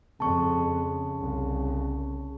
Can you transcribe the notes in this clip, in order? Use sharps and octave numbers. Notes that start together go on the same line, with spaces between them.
F2 C#3 A5 C#6
C2